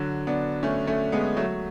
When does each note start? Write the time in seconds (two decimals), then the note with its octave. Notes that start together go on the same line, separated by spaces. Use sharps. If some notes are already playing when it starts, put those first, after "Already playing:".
Already playing: D3 F#3
0.27 B3 D4
0.63 A3 C#4
0.87 A3 C#4
1.12 G#3 B3
1.37 F#3 A3